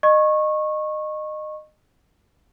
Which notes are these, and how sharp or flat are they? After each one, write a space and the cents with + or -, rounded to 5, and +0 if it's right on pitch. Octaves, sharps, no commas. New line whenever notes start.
D#5 -25 C#6 -20